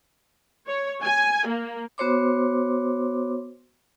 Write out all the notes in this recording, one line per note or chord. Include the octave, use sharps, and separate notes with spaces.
C#5
G#5
A#3
B3 F#4 C5 C#5 C6 D6